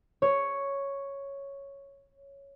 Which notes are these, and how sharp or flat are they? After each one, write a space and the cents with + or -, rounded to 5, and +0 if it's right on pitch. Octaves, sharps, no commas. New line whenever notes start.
C#5 +0